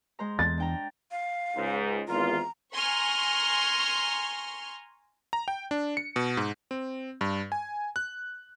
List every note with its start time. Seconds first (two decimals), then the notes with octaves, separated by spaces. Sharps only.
0.19 G#3 C5 A#5
0.39 E2 A6
0.58 D4 G5 A#5
1.11 F5
1.56 C#2 G#2
2.08 G#1 E2 F4 A#5
2.74 G#5 A#5 C6 C#6 F6
5.33 A#5
5.48 G5
5.71 D4
5.97 C#7
6.16 B2
6.37 G#2
6.71 C4
7.21 G2
7.52 G#5
7.96 F#6